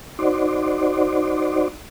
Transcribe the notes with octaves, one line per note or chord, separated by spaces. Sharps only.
D#4 F#4 C5 D5